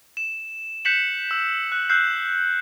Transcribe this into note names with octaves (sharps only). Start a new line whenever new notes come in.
E7
F#6 G6 B6 C#7 E7 F#7
E6
F#6
E6 F#6 G6 C7